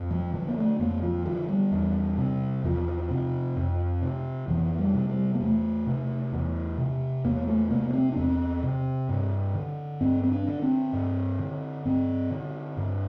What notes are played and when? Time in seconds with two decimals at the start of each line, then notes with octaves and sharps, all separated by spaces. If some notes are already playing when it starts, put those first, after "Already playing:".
Already playing: F2
0.11 F3
0.33 D3 F3
0.48 A#3
0.57 A3
0.79 F2 A#3
1.02 F3
1.25 D3 F3
1.48 G3
1.72 E2
2.18 C3
2.64 E2 F3
3.10 C3
3.56 F2
4.02 C3
4.48 F2 E3
4.79 G3
4.94 C3
5.09 G3
5.34 A#3
5.40 E2 A3
5.86 C3
6.32 E2
6.78 C3
7.24 E2 A#3
7.47 A3
7.70 C3 A#3
7.89 A#3
7.93 C4
8.12 D4
8.16 E2 C4
8.63 C3
9.09 G2
9.55 D3
10.01 G2 C4
10.23 C4
10.32 D4
10.47 D3
10.62 C4
10.93 G2
11.39 D3
11.85 G2 C4
12.31 D3
12.77 G2